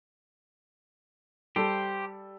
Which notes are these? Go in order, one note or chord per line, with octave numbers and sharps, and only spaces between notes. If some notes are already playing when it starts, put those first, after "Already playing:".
G3 G4 A4 C5